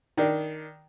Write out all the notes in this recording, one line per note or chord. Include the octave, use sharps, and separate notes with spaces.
D#3 D4